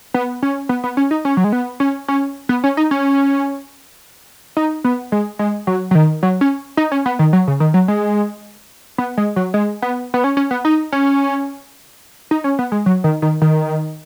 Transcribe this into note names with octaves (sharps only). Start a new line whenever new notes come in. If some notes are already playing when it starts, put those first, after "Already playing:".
B3
C#4
B3
B3
C#4
D#4
C#4
F#3
G#3
B3
C#4
C#4
B3
C#4
D#4
C#4
D#4
B3
G#3
G#3
F#3
F#3
D#3
F#3
C#4
D#4
C#4
B3
D#3
F#3
C#3
D#3
F#3
G#3
B3
G#3
F#3
G#3
B3
B3
C#4
C#4
B3
D#4
C#4
D#4
C#4
B3
G#3
F#3
D#3
D#3
D#3